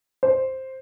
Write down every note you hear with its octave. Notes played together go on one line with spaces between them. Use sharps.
C5